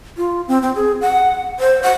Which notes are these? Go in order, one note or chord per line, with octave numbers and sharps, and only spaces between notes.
F4
C4
C4
G#4
F#5
C5
F#5